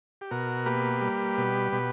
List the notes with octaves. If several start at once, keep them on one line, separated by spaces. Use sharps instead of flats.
G4
B2 F#4 A#4
A#3 G4 B4
G3
B2
B2